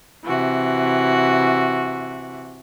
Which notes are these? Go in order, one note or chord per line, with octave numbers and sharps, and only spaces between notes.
C3 E3 F#4